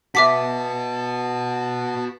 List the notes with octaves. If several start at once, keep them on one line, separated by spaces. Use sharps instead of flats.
F#4 B4 E5 A5 D6 B6